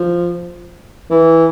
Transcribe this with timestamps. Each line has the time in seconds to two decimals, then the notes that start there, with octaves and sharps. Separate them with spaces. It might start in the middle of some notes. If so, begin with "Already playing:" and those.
Already playing: F3
1.10 E3